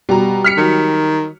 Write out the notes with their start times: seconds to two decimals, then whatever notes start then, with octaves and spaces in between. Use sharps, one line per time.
0.09 B2 G3 A#5
0.44 F6 B6 C#7
0.58 D#3 F#3